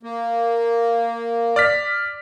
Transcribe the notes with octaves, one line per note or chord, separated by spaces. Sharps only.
A#3
D5 F6 B6